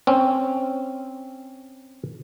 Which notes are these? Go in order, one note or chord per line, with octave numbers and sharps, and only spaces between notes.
C4 C#4